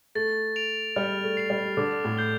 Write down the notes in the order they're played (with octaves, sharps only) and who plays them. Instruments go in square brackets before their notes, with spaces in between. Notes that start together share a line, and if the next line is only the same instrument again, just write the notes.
[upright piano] A3 [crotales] A6
[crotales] D7 F7
[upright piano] G3 [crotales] F6
[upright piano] A3
[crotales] C7 F7
[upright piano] G3
[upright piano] D3 [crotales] D6
[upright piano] A2
[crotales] G6 C7 G7